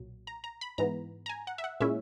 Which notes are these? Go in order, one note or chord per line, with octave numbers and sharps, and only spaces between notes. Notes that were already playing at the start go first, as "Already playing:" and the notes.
Already playing: B1 A#2 F#3
A#5
A#5
B5
G#2 E3 B3 A#5
A#5
G#5
F#5
E5
F#5
A#2 G#3 C#4 E4 E5